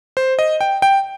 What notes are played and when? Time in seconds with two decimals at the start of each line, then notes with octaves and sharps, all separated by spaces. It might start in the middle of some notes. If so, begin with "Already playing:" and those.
0.17 C5
0.39 D#5
0.61 G5
0.82 G5